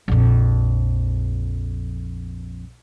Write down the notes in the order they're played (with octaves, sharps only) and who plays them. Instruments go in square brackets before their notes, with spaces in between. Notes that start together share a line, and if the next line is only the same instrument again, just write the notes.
[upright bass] A#1 F2